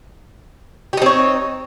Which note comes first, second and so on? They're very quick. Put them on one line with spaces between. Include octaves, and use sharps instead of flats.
G4 D#4 C4 C#5